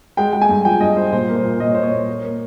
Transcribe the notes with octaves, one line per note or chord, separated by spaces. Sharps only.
G#3 G5
G#3 G5
G#5
G2
F3 G5
G2 D#5
G2 C5
A#2 C5
A#3
C5
A#2
A#2 D#5
C#5
A#2 C5
C#5
A#2
A#3
A#3